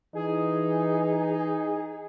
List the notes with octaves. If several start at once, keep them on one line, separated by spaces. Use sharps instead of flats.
E3 D#4 G#4